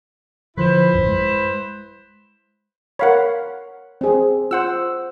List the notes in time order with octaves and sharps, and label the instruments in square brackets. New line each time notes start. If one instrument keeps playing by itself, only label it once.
[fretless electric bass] D3 F3 [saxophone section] E4 B4 C5
[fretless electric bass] A1 F#2
G#3
[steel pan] A#4 B5 [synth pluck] C#5 F5 F#5
[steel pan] C4 G#4
[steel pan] F4 [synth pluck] C5 F#5 E6